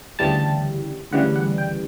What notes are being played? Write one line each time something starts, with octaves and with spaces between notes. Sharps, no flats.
D2 C#3 E3 G3 A5
D2 C#3 E3 G3 F#5
F#5
G5